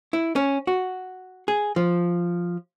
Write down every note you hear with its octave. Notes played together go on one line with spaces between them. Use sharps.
E4
C#4
F#4
G#4
F3